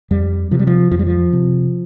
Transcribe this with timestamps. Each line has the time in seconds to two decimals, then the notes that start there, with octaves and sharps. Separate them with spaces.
0.11 F2 G3
0.51 C3 F3
0.59 G3
0.67 F3
0.91 F2 F3
0.99 G3
1.07 F3
1.33 C3